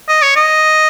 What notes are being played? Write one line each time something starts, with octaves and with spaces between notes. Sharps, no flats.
D#5
C#5
D#5